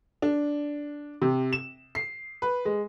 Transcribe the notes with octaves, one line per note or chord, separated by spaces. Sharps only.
D4
C3
E7
C7
B4
G#3